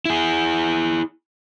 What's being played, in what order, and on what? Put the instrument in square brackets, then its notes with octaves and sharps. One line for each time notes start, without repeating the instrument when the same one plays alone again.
[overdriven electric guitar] E4 G#4